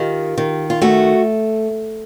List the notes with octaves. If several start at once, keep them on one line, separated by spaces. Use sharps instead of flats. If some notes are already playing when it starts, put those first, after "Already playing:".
Already playing: D#3 F4 G4
D#3
F4
A3 F#4